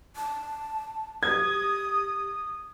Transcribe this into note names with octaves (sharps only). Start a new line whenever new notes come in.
A5
G4 D#6 G#6